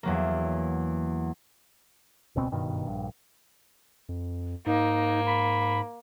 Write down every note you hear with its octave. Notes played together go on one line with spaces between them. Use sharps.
E2 F#3 A#3
E1 C#2 B2 C4
F#1 G2 B2 D#3
A#1 G2
F2
G#2 A#3 D#4
B5